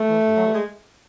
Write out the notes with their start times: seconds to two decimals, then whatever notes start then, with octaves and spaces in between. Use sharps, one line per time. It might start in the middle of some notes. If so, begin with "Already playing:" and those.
Already playing: A3
0.08 E3
0.26 G2
0.36 F#3
0.45 E3 G3
0.54 G#3